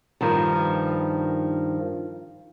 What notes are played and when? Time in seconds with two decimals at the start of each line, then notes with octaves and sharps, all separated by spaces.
0.21 G2 D#3 F3